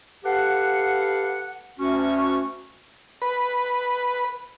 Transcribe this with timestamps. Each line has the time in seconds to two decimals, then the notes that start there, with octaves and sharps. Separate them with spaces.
0.25 G4 A4 B4 F5 F#5
1.79 D2 C#4 F#4 C#6
3.22 B4